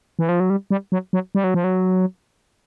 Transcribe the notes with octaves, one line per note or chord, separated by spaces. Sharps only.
E3
F3
F#3
G3
G3
F#3
F#3
G3
F#3
F3
F#3